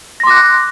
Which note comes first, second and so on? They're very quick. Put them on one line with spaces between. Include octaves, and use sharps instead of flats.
A#6 C6 D6 F#6